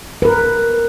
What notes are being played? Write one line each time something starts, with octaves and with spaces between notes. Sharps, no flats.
A#4 B4